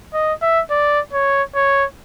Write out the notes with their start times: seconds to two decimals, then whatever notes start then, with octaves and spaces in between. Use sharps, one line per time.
0.14 D#5
0.42 E5
0.71 D5
1.13 C#5
1.55 C#5